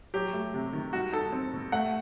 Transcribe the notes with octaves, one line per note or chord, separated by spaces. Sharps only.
F#3 G4
A3
C3
D#3
G3 F#4
D#4 A4
C4
B2
A3 F#5